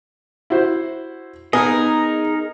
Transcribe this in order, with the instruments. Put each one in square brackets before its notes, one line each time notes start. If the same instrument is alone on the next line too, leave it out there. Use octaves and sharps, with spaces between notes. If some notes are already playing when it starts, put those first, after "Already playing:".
[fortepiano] E4 F#4 C5
[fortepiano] B3 [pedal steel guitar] D#4 A#4 D#5 [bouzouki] G#4